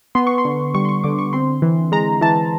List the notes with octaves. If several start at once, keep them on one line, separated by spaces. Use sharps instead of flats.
B3 C6
C#6
C6
D3
G3 C#6
C6
C#6
D3 D6
C#6
C4 C6
E3
G#3 A#5
E3 A5